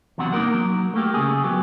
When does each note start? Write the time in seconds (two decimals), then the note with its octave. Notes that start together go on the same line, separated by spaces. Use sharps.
0.18 E2 C3 F#3 D4 F#5
0.32 A#3 D#4 A#4 F#5
0.54 F#3
0.94 A3 A#3 G4
1.14 C#3 A3 G#4
1.44 F#3 B3 G4